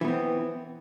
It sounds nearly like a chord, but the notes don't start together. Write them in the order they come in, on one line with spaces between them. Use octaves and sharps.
E3 B3 C4